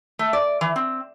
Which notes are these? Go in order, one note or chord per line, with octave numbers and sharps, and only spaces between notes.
A3
D5
E3
C4